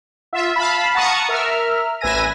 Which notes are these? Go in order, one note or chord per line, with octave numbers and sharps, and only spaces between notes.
F4 E5
F5 A5 B5
F#5 A5 A#5 C#6 D#6 C#7
A#4 E5 F6
A1 B4 E5 G#5 A#6 D#7